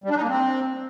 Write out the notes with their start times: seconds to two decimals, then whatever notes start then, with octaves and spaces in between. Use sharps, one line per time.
0.04 G3
0.10 D4
0.16 D#4
0.22 A#3
0.28 C4